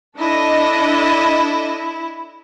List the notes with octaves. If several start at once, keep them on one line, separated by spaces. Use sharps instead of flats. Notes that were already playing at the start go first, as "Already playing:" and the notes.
D4 E4 A4 D#5